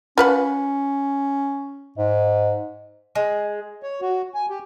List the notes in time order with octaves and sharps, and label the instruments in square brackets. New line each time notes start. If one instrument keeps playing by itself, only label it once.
[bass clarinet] C#4 [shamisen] F4 B4 F#5
[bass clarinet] G#2 [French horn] D#5
[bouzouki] G#3
[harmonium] C#5
F#4
G#5
G4